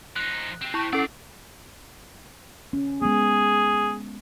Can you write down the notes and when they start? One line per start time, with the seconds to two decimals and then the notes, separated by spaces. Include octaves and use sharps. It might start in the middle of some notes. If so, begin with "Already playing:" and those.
0.16 F3 D#4 F#6
0.61 C4 G4
0.74 E4 C#6
0.93 B1 C#4 A4 D5 C7
2.73 C#4
3.02 G#3 B3 G#4